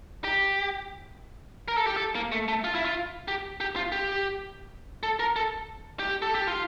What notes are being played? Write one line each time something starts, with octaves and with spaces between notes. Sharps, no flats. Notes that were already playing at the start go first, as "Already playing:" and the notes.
G4
A#4
A4
G4
A4
A#3
A3
A3
F4
E4
F4
G4
G4
F4
G4
A4
A#4
A4
G4
A4
G4
F4